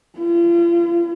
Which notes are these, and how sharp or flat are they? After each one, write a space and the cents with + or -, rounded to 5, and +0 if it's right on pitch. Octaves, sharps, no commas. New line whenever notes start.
F4 -40